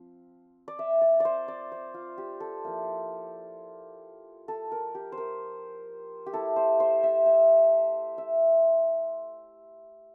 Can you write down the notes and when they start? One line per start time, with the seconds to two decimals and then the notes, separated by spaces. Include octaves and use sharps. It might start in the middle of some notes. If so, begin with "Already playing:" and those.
Already playing: F3 C4
0.68 D5
0.79 E5
1.01 D5
1.20 C5 D5
1.48 D5
1.72 C5
1.94 F4
2.18 G4
2.40 A4
2.64 F3 A#3 E4
4.48 A4
4.72 A#4
4.95 G4
5.12 C5
5.18 A#4
6.26 G4
6.33 A3 E4 A4
6.56 C5
6.80 C5
7.03 E5
7.26 E5
8.18 E5